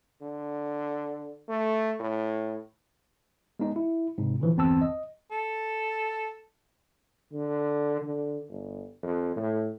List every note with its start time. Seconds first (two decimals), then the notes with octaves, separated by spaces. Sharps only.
0.22 D3
1.49 A3
2.00 A2
3.59 G#3 B3 D#4 D#5
3.76 E4
4.18 G#2 C3
4.40 A#2 D3 E3 F3
4.56 G1 E2 C4 A5 E6
4.81 D#5
5.32 A4
7.32 D3
8.02 D3
8.49 G1
9.03 F2
9.36 A2